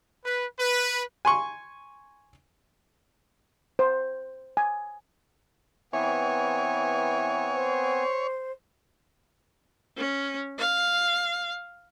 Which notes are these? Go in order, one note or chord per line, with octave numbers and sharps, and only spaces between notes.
B4
B4
G#5 C6 C#6
C5
G#5
E3 B3 C4 C#5 G#5
C5
C#4
F5